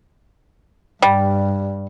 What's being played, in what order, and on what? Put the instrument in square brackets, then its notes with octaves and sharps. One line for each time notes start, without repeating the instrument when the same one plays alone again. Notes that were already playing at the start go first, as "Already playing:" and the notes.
[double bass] G2 [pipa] G3